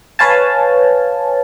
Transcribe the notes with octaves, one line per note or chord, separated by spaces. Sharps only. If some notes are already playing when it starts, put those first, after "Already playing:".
B4 C#5 F5 G#5 A5